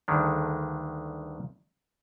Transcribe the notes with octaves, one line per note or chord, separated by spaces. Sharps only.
D2 G2 D3 D#3 G#3